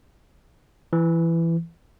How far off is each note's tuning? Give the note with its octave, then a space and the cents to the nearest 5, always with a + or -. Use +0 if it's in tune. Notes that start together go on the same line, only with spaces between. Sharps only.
E3 +15